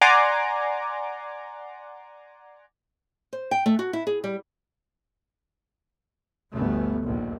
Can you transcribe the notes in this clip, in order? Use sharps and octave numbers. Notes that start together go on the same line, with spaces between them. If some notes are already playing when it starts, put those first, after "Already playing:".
D5 F#5 G#5 A#5 C6 D6
C5
G5
A3
F#4
E4
G#4
G3
G1 D2 A3 B3
A#1 D#2